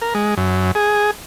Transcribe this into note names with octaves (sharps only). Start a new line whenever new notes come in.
A#4
G#3
F#2
G#4